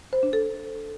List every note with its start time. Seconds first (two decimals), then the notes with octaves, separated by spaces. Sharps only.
0.13 C5
0.23 D4
0.33 A4